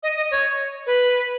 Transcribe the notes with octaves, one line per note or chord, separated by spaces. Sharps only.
D#5
D#5
C#5
B4